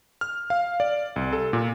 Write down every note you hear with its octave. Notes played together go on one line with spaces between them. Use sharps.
F6
F5
D5
C2
A4
A#2